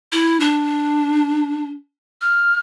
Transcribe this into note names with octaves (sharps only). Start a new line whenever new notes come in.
E4
D4
F6